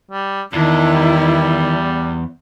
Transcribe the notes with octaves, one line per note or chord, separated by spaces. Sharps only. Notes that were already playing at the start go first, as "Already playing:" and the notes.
G3
E2 D#3 D4 E4
G3